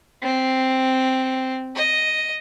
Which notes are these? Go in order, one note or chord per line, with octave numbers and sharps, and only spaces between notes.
C4
D#5